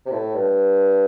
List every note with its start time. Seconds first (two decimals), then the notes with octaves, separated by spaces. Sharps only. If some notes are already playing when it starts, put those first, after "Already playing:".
0.06 C3
0.11 A2
0.35 G2